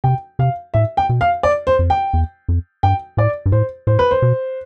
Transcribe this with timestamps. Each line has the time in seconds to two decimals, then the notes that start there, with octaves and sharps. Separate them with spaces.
0.04 C3 G5
0.39 C3 F5
0.74 A2 E5
0.97 G5
1.09 B2
1.21 F5
1.43 D5
1.67 C5
1.79 F2
1.90 G5
2.14 E2
2.49 F2
2.83 G2 G5
3.17 A2 D5
3.46 G2
3.52 A2 C5
3.87 A2 C5
3.99 B4
4.11 C5
4.22 B2